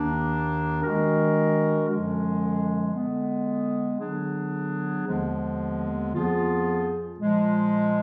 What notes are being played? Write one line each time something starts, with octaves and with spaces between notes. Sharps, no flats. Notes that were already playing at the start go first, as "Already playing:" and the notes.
Already playing: D#2 D#3 A#3 D4
D#3 G#3 D4 F#4 A#4
F#2 D3 F3 G#3
D3 G#3 B3
D3 F#3 B3 D4 G#4
D#2 D3 F3 G#3 B3
F2 F3 B3 F4 G#4
A#2 F3 G#3